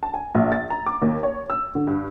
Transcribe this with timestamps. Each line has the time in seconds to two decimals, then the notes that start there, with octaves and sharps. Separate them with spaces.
0.03 A5
0.14 G#5
0.35 A#1
0.52 A6
0.70 A#5
0.86 D6
1.02 D#2
1.23 C#5
1.50 E6
1.75 D3
1.87 G2